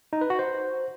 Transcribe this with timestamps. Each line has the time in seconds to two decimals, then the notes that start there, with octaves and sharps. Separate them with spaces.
0.13 D#4
0.21 B4
0.30 F#4
0.39 C5